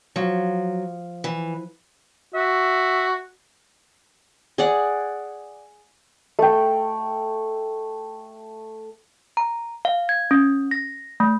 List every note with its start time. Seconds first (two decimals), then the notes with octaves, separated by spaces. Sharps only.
0.16 F3 F#3
1.24 E3
2.35 F#4 E5
4.58 G#4 D5 F#5
6.39 A3 G5
9.37 A#5
9.85 F5
10.09 G#6
10.31 C#4
10.71 A#6
11.20 A3